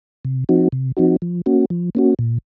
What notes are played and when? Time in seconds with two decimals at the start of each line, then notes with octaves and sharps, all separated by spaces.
0.25 C3
0.49 F3 C4 D#4 F#4
0.72 C3
0.97 F3 C4 D#4 F#4
1.22 F3
1.46 A#3 C#4 F#4
1.70 F3
1.95 A#3 C#4 F#4
2.19 A#2